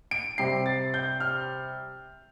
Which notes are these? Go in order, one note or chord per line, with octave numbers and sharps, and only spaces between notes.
D7
C3 G3 C7
A6
G6
F6